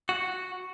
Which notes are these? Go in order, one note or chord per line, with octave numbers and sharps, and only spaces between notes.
F#4